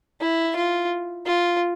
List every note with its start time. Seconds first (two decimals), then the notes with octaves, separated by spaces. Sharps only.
0.21 E4
0.56 F4
1.26 F4